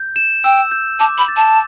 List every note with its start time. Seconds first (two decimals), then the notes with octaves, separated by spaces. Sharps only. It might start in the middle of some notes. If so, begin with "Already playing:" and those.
Already playing: G6
0.16 E7
0.44 G5 E6
0.71 G6
1.00 A5 D6
1.18 B5
1.28 A6
1.37 A5